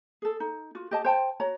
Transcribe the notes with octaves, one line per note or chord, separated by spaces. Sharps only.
G#4 A4
D#4
F4 F#4
G4 D#5 A5
C5 G5 A5
F#4 C#5 A#5